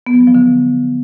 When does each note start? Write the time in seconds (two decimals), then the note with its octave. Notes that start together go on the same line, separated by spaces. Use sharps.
0.07 B3
0.14 F3
0.21 F#3
0.28 F3
0.35 D3